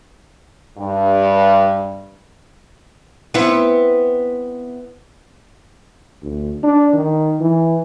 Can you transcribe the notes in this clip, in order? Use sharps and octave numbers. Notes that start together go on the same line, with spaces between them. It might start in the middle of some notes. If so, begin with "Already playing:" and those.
G2
B3 C4 E4
D2
D4
D#3
E3